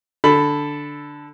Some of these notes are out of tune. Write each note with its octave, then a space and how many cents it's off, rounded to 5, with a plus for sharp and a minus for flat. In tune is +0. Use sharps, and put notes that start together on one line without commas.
D3 +0 A4 +0 B5 +10